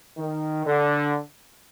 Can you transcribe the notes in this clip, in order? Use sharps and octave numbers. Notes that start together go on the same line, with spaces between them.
D#3
D3